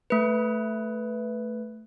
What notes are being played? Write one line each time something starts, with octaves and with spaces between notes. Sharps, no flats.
A3 B4